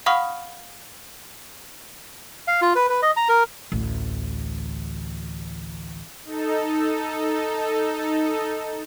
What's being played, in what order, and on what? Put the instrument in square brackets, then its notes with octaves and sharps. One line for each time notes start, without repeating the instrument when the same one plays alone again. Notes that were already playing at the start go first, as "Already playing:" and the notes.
[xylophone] F5 F#5 B5 C#6 D#6 F6
[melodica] F5
F4
B4
B4
D#5
A#5
A#4
[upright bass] A1 D2
[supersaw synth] D#4 A4